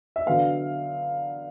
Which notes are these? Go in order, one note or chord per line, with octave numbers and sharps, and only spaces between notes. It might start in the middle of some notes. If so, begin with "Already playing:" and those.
E5
D3 F#3 B3 F5